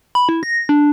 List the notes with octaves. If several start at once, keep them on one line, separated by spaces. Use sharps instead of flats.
B5
E4
A#6
D4